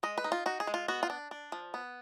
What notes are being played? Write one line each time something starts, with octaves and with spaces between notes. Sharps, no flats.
G#3 D#5
B4
D#4
F4
D#4 F#4
G#4
G#3
F4
B3 F#4
F4
D4
D4
F3
B3